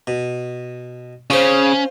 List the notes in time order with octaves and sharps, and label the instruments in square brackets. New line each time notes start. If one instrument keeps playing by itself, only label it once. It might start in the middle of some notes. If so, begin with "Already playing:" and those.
[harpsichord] B2
[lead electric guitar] C#3 [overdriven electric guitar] C#4 [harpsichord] F4 C5